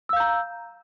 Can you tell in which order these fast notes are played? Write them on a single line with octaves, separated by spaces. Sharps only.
E6 F5 G6 A#5